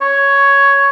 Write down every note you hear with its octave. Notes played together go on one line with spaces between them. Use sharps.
C#5